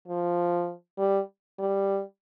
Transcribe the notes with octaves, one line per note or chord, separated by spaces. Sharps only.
F3
G3
G3